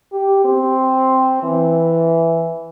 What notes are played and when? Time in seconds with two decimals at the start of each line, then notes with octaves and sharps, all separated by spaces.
0.12 G4
0.44 C4
1.43 E3